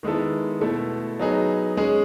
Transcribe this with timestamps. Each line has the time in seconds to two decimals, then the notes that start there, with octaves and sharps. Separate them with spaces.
0.03 D#3 G#3 B3 E4 A4
0.61 B2 A3 E4 A4
1.19 F#3 B3 D#4 G#4
1.77 G#3 C#4 G#4